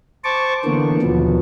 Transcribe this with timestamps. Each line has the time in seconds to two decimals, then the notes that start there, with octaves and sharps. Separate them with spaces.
0.24 C5 A5 C#6 D6
0.65 D3 E3 A#3 B3
1.02 D#2 B2 F3 F#3 B3